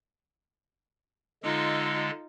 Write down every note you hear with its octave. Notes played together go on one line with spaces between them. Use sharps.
D3 G#3 D#4 F4 A4